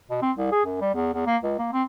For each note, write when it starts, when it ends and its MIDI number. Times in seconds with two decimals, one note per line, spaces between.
0.11 0.20 47
0.22 0.32 60
0.37 0.51 36
0.52 0.64 68
0.66 0.79 42
0.81 0.93 55
0.95 1.11 40
1.14 1.26 40
1.27 1.37 58
1.44 1.54 37
1.59 1.72 58
1.73 1.83 60